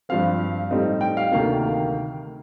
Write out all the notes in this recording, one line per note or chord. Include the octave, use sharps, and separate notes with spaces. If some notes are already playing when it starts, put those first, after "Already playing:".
G2 F3 C4 F5
A2 G3 C4 D#4
G5
F5
D2 C3 D#3 A#3 F5